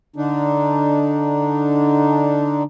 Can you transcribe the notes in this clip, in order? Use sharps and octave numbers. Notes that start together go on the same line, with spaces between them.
D3 D4 D#4